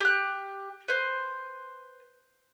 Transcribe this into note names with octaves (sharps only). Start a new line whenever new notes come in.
G4 F#6
B4 C5